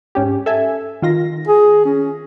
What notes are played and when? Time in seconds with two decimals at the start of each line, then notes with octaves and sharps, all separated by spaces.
0.15 G#2 C#4 G4
0.46 A4 E5 G#5
1.02 D#3 F4 A#6
1.48 G#4
1.85 C#4